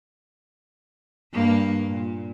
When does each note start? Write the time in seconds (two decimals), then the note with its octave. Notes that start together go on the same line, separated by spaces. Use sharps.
1.33 G2 A#3
1.87 A#2